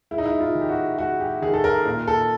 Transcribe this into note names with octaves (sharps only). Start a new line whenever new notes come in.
G#3 E4
D#4
E4
F4
D#3
G4
F#4
G#3 F#4
G4
D#3 G#4
A4
A#4
A#2 A#4
A4